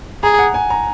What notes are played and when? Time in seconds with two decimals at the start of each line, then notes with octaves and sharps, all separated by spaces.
0.23 G#4 A#5
0.39 F#5
0.54 G#5
0.70 A#5